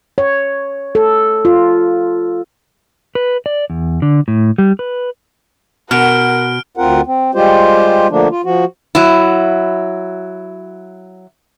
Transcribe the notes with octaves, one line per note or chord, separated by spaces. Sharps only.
C#5
A4
F4
B4
D5
E2
D3
A2
G3
B4
B2 A#4 F#5 F6 D7
D2 C4 F4 A#4 F#5
C4
G3 G#3 F4 G4 C5
D3 F3 A3 A#3 D4
F4
F3 F#4
F#3 E4